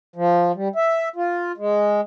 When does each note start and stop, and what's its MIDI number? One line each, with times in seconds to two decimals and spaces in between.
0.16 0.52 53
0.55 0.68 55
0.76 1.08 76
1.16 1.52 65
1.57 2.01 56